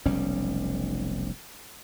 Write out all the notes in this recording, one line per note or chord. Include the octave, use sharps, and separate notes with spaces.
F1 B1 G3 C#4